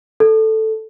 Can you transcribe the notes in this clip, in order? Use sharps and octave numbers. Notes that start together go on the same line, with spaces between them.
A4